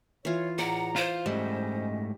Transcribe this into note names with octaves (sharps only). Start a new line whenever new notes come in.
E3 F4 C#5
A2 G#4 D5 F#5 A#5
F4 C5
G#2 G3 A3 C#4 D#5